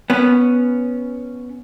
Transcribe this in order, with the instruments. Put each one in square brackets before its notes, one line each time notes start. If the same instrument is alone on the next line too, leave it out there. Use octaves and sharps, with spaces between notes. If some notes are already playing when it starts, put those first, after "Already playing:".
[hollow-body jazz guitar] B3 C#4